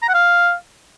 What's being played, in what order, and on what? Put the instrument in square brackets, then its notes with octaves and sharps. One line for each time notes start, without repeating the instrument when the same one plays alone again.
[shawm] A#5
F#5
F5